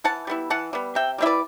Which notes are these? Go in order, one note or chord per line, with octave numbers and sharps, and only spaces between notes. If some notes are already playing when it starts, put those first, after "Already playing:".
E3 F#5 A5
G3 B3 E4
E3 F#5 A5
G3 B3
C3 E5 G5
G3 C4 E4 E5
B4 D5